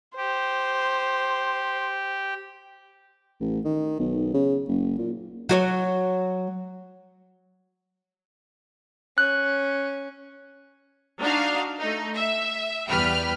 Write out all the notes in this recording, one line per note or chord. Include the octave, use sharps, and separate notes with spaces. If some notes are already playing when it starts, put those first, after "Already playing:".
G4 C5
A1
D#3
B1
C#3
F#1
A#2
F#3 F#4 C#5
C#4 F#6
D4 D#4 F#4 F5
A3 D#4
E5
E2 G3 B4 G5 F6